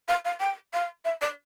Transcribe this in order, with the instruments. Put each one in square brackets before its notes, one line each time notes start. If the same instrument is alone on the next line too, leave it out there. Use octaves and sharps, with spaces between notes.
[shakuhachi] F5
F5
G5
F5
E5
D5